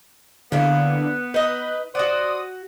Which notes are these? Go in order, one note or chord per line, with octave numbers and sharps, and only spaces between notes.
D3 A#3 B3 E4
D#4 B4 D#5
F#4 C5 D5 F#5 D#6